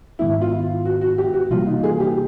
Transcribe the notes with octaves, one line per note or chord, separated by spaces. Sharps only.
G#2 D#3 G#3 B3 E4
F4
F#4
F#4
G4
F#4
C3 E3 G3 A#3 F4
D#4
G#4
G4